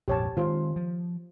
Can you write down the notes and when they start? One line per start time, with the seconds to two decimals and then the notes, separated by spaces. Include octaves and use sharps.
0.08 A#1 F2 G#2 G4 C#5 A5
0.37 D#3 G#3 C4 F4 C5
0.76 F3